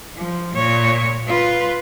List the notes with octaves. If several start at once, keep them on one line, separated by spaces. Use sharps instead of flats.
F3
A#2 C#5
F4 B4